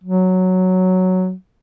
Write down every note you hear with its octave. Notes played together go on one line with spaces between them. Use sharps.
F#3